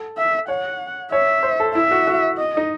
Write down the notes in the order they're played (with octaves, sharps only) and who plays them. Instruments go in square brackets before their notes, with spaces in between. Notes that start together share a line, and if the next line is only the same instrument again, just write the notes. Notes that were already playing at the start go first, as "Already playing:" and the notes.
Already playing: [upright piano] A4
[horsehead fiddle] E5
[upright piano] C#5 [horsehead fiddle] F#5
[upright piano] C#5 [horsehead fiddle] E5
[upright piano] C5
A4
[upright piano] E4 [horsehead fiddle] E5
[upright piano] F#4
F#4
[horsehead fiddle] D#5
[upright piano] D#4